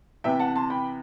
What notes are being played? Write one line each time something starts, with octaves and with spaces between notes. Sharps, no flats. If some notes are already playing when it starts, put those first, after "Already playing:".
C3 E3 B3 E5 G5
F#5 A5
A5 C6
G5 B5